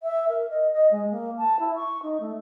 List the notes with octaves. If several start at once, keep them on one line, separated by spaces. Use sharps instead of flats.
E5
A#4
D#5
D#5
G#3
A#3
A5
E4
C#6
D#4
A3